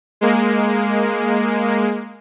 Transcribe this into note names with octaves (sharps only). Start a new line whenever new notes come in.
G#3 A#3